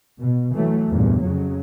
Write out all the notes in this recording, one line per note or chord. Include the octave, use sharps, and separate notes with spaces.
B2
E3 F#3 A3
E2 G2 A#2
F2 C#3 F#3